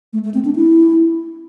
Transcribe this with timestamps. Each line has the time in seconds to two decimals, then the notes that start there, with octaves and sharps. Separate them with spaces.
0.13 A3
0.24 A3
0.34 C4
0.45 D4
0.56 E4